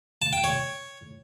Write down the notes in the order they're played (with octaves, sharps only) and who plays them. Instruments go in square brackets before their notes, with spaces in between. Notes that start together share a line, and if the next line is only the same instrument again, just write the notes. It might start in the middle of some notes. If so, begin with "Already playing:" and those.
[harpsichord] A5
G5
C#5